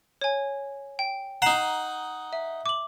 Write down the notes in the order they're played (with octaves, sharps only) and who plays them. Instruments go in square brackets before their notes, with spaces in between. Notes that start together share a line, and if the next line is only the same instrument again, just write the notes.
[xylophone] C#5 G#5
G5
[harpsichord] D#4 F#5 [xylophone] A#5 C7 E7
[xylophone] E5
D6 F#7